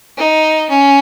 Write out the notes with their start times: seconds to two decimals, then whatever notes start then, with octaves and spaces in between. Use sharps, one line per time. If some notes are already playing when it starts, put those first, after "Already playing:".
0.17 D#4
0.70 C#4